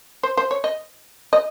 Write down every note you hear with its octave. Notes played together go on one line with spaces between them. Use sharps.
C5
C5
C#5
D#5
D#5